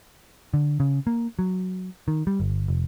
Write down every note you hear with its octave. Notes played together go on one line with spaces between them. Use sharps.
D3
C#3
A#3
F#3
D#3
G3
G1
F1